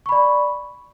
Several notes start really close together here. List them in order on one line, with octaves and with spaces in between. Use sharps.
C#6 B5 D5